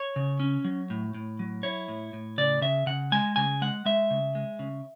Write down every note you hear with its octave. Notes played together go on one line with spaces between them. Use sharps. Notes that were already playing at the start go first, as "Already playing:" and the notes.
Already playing: C#5
C#3
C#4
F#3
A2
A2
F#3
E4 C#5
A2
A2
C#3 D5
C#3 E5
C#3 F#5
G#3 G#5
C#3 G#5
G#3 F#5
G#3 E5
C#3
G#3
C#3